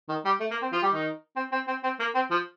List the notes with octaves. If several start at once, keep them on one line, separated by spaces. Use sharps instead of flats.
D#3
G3
A3
A#3
C4
F3 F4
G3 G4
D#3 D#4
C4
C4
C4
C4
A#3
C4
F3